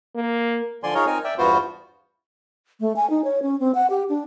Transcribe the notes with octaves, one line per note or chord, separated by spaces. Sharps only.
A#3
D3 F3 D5 G#5 C6
D#4 F4 G#4 A#4 C#5
C4 D#4 A#4 G#5
D5 E5 G5
E2 G2 B3 F4 F#4 C5
A3
G#5
D#4
C#5
C#4
C4
F#5
G4
D4